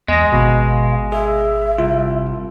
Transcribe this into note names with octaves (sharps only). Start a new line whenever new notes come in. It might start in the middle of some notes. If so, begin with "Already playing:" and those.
E2 G#3 D#5 A#6
G#1 B2 F5
G#4 E5
C2 F4